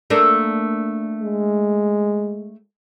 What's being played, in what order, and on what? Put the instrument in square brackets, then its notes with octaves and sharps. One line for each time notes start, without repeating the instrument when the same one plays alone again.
[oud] A3 A#3 D4
[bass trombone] G#3